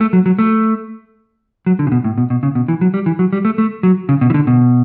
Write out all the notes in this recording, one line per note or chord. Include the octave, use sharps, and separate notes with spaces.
A3
F#3
F#3
A3
F#3
D3
C#3
B2
A2
B2
B2
C#3
B2
E3
F#3
G3
E3
F#3
G3
A3
A3
F#3
C#3
B2
E3
D3
B2